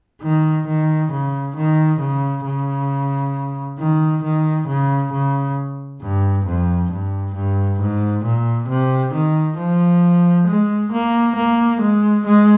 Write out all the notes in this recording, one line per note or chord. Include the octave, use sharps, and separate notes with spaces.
D#3
D#3
C#3
D#3
C#3
C#3
D#3
D#3
C#3
C#3
G2
F2
G2
G2
G#2
A#2
C3
D#3
F3
G#3
A#3
A#3
G#3
G#3